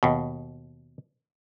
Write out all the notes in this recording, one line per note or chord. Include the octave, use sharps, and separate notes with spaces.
D#2 B2